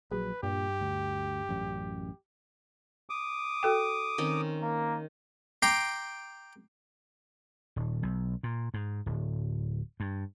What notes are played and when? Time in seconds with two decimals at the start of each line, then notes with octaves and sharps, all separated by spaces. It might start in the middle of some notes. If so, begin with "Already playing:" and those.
0.11 A#1 F#3 G#4 B4
0.43 G2 A#2 G4
0.81 D2
1.49 A1 F#2
3.10 D6 D#6
3.63 F#4 A4 G5
4.18 D#3 C4 C#4
4.62 A#3
5.62 G5 A#5 C6 D6
7.76 D#1
8.03 B1
8.43 A#2
8.74 G#2
9.06 D1
10.00 G2